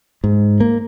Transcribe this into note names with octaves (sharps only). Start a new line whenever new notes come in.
G#2
A#3